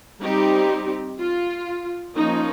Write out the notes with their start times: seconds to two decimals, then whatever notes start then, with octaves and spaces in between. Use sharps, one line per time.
0.21 G3 C4 D#4 G4
1.19 F4
2.16 F3 A#3 C#4 D#4